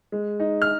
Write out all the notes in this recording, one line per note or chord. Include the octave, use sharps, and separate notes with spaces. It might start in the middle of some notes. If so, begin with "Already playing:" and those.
G#3
D#4
F6